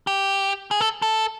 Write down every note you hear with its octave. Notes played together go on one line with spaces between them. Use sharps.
G4
G#4
A4
A4